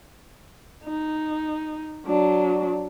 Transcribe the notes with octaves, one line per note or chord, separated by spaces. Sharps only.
D#4
F#3 D4